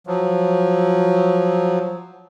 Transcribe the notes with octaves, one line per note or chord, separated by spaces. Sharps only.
F3 F#3